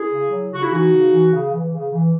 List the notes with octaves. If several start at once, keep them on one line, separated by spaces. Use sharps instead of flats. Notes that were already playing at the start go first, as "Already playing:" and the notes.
Already playing: E4 G#4
C#3
F#3
C#3 F#4
E4
E3 D#4 F#4
C#3
E3
C#3
E3
C#3
E3